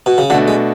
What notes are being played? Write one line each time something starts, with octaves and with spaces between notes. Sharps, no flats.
B2
C#3
B2 D3 A3 D4 F#4
G#3